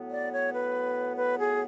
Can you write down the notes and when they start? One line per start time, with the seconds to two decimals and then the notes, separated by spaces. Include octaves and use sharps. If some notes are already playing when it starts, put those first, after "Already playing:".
Already playing: A2 F#3 B3
0.11 D5
0.33 C#5
0.53 B4
1.17 B4
1.39 G#4